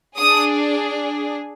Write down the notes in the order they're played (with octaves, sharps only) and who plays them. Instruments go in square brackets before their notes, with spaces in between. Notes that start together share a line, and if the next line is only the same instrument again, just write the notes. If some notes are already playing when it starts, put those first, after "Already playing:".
[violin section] D4 G#4 D#6